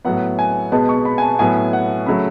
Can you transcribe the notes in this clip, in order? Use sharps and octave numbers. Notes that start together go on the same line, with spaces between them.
A2 F#3 B3 F#5
G#5
B2 G#3 B3 A5
C#6
B5
G#5
A5
A2 F#3 B3 G#5
F#5
C#3 F#3 A3 B5